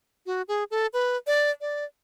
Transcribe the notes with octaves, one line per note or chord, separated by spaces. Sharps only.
F#4
G#4
A4
B4
D5
D5